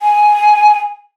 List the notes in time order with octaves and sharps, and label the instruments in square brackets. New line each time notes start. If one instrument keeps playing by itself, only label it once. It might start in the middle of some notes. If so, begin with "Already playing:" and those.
[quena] G#5